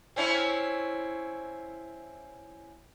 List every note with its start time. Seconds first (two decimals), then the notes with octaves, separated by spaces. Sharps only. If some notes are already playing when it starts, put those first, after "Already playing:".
0.16 C4 C#4 E4